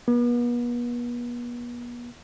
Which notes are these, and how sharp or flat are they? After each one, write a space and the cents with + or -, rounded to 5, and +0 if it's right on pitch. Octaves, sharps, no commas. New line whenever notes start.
B3 -40